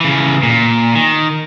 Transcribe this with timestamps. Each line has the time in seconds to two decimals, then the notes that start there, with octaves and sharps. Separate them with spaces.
0.01 C#3 E3
0.43 A#2
0.95 D#3